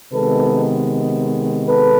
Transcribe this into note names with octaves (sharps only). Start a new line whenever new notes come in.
C3 D#3 G#3 B3 A4 B4
A4 B4